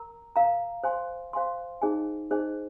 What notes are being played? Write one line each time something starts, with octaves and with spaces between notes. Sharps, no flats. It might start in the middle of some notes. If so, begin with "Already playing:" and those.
Already playing: A#4 A#5
A#4 F5 A#5
C5 F5 G#5 C6
C5 F5 G#5 C6
D#4 G#4 C5 D#5 G#5
D#4 G#4 C5 D#5 G#5